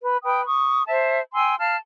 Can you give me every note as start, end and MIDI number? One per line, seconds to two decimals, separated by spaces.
0.03 0.16 71
0.24 0.44 71
0.24 0.44 79
0.24 0.44 87
0.46 0.82 85
0.46 0.82 87
0.87 1.20 72
0.87 1.20 76
0.87 1.20 81
1.34 1.54 79
1.34 1.54 80
1.34 1.54 84
1.34 1.54 88
1.58 1.76 77
1.58 1.76 81
1.58 1.76 89